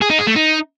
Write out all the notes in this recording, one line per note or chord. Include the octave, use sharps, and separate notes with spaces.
G#4
D#4
G#4
A3
D#4